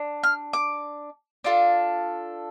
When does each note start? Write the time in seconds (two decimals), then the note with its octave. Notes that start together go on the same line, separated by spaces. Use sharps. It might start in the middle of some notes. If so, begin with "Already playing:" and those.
Already playing: D4
0.23 F6
0.53 D6
1.44 D4 F4 A4